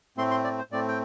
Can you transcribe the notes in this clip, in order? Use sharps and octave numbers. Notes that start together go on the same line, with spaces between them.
A2 A3 C4 C6
C6
D5
C5
A2 A3 C4 D5
G5